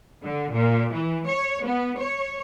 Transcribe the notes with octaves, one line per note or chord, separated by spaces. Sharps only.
D3
A#2
E3
C#5
B3
C#5